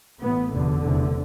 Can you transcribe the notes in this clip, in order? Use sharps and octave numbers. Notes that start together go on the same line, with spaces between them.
A1 A2 B3
F1 E2 B2 D3
F1 E2 C3